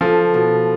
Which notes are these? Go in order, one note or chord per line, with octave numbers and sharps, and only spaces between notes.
F3 A4
B2